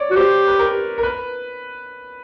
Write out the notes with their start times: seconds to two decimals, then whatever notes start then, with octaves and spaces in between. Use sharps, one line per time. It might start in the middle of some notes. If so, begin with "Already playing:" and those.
Already playing: C#5 D5
0.11 F#4
0.16 G4 C5
0.48 B4
0.59 A#4
0.98 A#4
1.03 B4